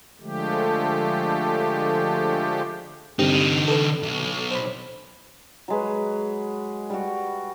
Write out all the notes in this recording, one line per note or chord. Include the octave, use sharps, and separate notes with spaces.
D3 F3 G#3 A3 G4
G2 D3 C4 D#4 G4
A4 B4
B1
C5 B5
F#3 G#3 B4
G3 F#4